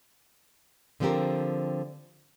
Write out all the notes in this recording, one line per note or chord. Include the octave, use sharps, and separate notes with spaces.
D3 F3 B3 C4 G4 A#4